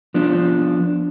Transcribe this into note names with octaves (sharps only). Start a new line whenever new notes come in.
F3 B3 D4